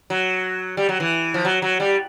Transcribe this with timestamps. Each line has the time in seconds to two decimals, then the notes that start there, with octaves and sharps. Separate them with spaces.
0.10 F#3
0.77 G3
0.89 F#3
1.00 E3
1.34 F3
1.45 F#3
1.62 F#3
1.80 G3